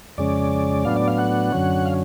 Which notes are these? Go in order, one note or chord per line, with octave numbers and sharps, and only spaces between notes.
F2 C#3 G#3 C#4 D5
A2 F#3 B3 D4 F5
D5
F5
F#5
F#2 D3 F#3 C#4
F5